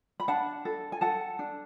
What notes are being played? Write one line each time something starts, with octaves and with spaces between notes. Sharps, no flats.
B5
D4 F#5 A5
A4
G#5
A4 F#5 A5
D4